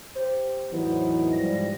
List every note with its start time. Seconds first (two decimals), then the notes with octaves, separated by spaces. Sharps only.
0.15 G4 C5
0.71 E2 A2 E3 F#3 B3 D#4
1.33 G#2 F3 G3 A#6